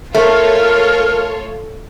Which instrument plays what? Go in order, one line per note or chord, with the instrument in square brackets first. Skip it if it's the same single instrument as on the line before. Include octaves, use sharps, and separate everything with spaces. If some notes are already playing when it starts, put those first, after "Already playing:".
[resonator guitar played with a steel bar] A3 [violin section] F4 A4 C#5 [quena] A#4